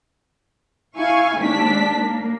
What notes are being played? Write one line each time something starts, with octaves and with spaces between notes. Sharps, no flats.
E4 F5 G#5 C#6
D#2 G#3 D4 B6
A#3